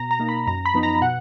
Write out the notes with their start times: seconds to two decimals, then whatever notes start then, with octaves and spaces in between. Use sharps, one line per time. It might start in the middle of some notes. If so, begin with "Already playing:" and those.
Already playing: B2 A#5
0.11 A#5
0.20 A#3 D#4
0.29 B5
0.47 F#2 A#5
0.65 B5
0.74 F3 B3 D#4
0.83 A#5
1.01 B2 F#5